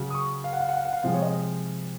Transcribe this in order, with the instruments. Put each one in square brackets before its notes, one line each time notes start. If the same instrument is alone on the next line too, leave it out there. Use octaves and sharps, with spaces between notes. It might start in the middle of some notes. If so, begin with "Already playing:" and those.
Already playing: [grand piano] C#3 F#3
D#6
C#6
F5
F#5
F5
F#5
F5
F#5
F5
C3 F3 G#3 F5
C#5
D#5